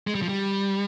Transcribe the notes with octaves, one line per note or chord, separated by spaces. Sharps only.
G#3
G3
F3
G3